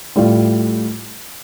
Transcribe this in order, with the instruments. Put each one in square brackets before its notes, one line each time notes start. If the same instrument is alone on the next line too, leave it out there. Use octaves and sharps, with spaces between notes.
[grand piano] A2 G3 F4